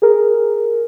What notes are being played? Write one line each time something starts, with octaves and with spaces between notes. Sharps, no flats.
G#4 A#4